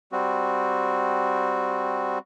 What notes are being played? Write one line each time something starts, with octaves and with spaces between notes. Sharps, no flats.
G3 C4 F#4